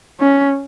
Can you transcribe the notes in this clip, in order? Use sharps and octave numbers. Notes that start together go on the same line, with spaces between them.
C#4